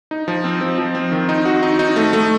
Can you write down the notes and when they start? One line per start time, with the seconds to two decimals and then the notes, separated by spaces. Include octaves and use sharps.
0.11 D#4
0.28 F3
0.44 C4
0.61 F3
0.78 F3
0.95 C4
1.12 D#3
1.29 D#4
1.45 F#4
1.63 D#4
1.79 D#4
1.96 A3
2.13 A3